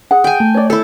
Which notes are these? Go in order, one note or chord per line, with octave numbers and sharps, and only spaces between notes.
G#4 F#5
G5 G#5
A3
C#5 D5
E4 A4 C#5